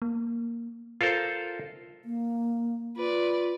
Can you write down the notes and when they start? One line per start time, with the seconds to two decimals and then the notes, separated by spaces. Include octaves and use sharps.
0.02 A#3
1.01 F4 A4 A#4 C5
2.05 A#3
2.97 F4 B4 D5